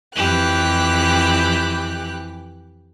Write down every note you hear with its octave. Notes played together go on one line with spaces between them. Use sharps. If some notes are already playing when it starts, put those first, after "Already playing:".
F2 E3 G4 F#6